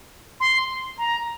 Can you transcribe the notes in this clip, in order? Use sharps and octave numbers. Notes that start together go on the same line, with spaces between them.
C6
A#5